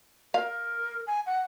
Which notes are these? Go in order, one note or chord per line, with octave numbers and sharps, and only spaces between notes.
A#4 F5
G#5
F#5